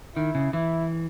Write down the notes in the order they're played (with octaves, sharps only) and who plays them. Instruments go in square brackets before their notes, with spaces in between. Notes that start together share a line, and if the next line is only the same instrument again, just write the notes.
[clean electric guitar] D#3 [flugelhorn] E4
[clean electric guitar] C#3
[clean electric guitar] E3 [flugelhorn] E4